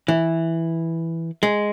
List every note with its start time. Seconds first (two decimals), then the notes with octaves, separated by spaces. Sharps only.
0.08 E3
1.43 G#3